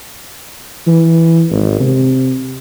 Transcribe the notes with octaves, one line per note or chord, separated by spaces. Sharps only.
E3
G#1
C3